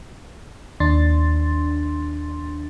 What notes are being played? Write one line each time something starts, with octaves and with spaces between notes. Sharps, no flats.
D#2 D4 C6 A6